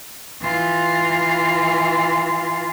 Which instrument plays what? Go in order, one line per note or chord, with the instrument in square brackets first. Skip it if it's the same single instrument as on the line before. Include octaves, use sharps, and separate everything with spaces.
[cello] E3 F4